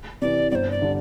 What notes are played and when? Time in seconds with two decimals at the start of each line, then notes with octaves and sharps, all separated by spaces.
0.22 C3 E3 D5
0.51 G1 C5 D5
0.71 D5
0.82 D3 G3 D4